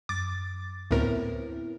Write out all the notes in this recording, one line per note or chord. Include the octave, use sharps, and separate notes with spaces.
F#2 D6 A6
D2 A2 B3 C4 E4 A#4